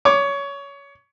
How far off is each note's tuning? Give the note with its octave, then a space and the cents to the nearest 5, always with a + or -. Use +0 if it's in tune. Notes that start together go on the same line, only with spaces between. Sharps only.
C#5 +20 D6 +10